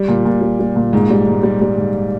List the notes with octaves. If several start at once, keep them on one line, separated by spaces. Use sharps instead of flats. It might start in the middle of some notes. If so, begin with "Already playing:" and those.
Already playing: G3
A#2
A#2
G3
G3
A#2
G#2
G3
G#2
G3
G3
G#2